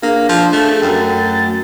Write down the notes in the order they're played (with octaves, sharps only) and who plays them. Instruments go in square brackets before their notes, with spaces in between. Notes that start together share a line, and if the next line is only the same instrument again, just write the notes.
[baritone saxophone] A#3 [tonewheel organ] D4 G#4
[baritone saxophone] F3
A3
[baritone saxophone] F#2 [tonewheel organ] A3 G5 A6